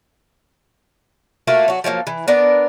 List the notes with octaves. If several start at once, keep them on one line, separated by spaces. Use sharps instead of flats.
A3 A#3 F4 F#4
F#3 F#4
F3 F#3 G#3 A#3
E3
B3 D4 A#4 D5